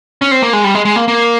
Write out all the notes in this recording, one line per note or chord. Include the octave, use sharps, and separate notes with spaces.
C#4
C4
A#3
G#3
G3
G#3
G#3
A#3
A#3